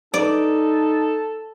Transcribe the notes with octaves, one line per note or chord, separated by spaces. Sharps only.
D#4 A4 D5